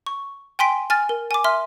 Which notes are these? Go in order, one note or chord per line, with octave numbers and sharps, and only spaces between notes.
C#6
G5 G#5 C6 B6 D7
G#5 F6 A6
A#4
G#5 D6
E5 C6 F6